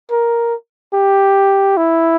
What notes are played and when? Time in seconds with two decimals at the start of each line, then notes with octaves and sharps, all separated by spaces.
0.11 A#4
0.94 G4
1.77 E4